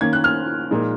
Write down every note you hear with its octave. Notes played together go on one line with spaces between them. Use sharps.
D#3 A#3 C#4 G#6
F#6
F6
A#2 F3 G#3 D#4